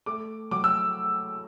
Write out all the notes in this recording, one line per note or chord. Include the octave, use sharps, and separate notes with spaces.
A3 D6
F#3 D6
E6